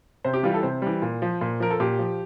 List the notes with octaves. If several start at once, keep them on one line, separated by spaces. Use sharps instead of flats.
C3 C5
G4
E3 G3 F4
A4
C3 C5
E3 G3
A#2
F3
A#2
F3 A#4
A4
A#2 G4
F3